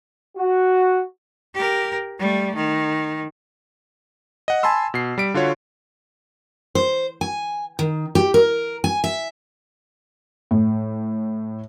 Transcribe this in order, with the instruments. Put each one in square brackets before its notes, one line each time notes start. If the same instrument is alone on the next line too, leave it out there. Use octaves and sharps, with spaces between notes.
[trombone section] F#4
[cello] G4 A#4
G3 A3
D#3
[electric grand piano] D#5 F#5
G#5 A5 B5 C6 E6
B2 C7
G3 B6 D7
D3 F4 F#4 C#5
[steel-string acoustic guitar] C5
G#5
D#3
G4
A#4
G#5
E5
[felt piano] A2